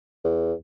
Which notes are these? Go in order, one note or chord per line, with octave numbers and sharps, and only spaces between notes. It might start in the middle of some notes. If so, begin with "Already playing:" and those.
E2